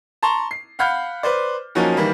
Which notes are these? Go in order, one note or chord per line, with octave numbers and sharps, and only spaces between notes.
A5 A#5 C6 C#6
C7
F5 F#5 B5 F6 G6
B4 C5 D5
F3 F#3 A#3 C#4 D#4 F#4
D#3 E3 G3 A#3